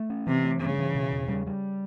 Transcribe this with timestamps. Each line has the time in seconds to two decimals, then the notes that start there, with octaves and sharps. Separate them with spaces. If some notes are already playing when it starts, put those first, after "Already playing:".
Already playing: A3
0.10 C#4
0.27 C3 E3
0.44 A3
0.61 G2 C#3
0.78 E3
0.95 B2
1.12 E2
1.28 G3
1.46 G3